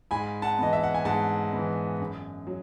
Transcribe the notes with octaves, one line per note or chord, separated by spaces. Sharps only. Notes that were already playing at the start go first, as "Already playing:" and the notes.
G#2 G#5 B5
F#5 A5
E3 B3 D#5
E5
F#5
G#5
G#2 F#5 A5
E3 B3
F#2
F#3